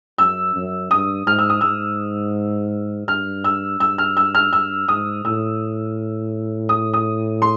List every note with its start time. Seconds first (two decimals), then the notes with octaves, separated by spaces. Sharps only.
0.18 F#2 E6
0.55 F#2
0.91 G2 D#6
1.27 G#2 F6
1.39 E6
1.50 D#6
1.61 G#2 E6
3.07 G2 F6
3.44 E6
3.80 G2 E6
3.98 F6
4.17 E6
4.35 F6
4.53 G2 E6
4.88 G#2 D#6
5.24 A2 E6
6.69 D#6
6.94 D#6
7.42 C6